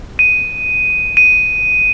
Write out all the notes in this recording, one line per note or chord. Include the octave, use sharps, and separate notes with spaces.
D#7
D#7